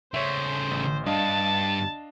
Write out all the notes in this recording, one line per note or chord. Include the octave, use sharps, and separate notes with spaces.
C#3 A3 C5 C#5 E5
A1
G2 D4 D#5 F5 A5 A6